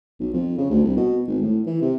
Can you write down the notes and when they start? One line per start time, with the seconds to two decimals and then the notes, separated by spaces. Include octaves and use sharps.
0.19 B1
0.33 F2
0.58 C#3
0.70 D2
0.84 C2
0.97 B2
1.27 G#1
1.42 A2
1.67 E3
1.81 C3